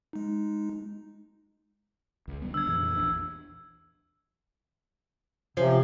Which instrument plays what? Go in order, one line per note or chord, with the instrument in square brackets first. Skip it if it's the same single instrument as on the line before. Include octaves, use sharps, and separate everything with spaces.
[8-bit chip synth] G#3 D#4
[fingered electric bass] C#2
D3 G3 B3
[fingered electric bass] D4 [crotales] E6 G#6
[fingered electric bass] F2 A#2 E3
A#1 E2 D4
[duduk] C3 [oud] F3 C#4